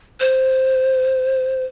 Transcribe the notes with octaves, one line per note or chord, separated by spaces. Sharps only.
C5